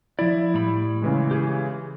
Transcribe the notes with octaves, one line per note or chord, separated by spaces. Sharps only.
F3 E4 D5
A2 G3 B5
C#3 E3 G#3
G4 G#4